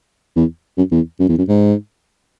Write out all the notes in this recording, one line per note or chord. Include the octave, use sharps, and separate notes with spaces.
E2
F#2
E2
F#2
E2
F#2
G#2